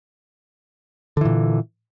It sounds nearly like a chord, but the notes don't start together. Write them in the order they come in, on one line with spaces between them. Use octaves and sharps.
D3 E3 A#2